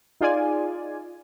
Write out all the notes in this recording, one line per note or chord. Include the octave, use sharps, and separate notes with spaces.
D#4 F4 G#4 D5 G#5